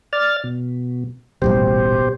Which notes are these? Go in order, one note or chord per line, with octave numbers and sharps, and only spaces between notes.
D5 F6 A6
B2
D#1 A1 B2 G3 G4 C5